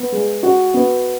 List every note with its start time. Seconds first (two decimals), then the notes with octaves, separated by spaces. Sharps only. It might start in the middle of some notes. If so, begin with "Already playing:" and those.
Already playing: B3
0.12 G#3
0.43 F#4
0.74 B3